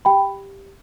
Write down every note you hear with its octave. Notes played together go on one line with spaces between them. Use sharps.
G4 G5 B5